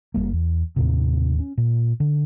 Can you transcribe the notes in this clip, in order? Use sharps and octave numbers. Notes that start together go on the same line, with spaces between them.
F#1 E2 G3 A#3
E2
D#2 A2 C3
C#4
A#2
D3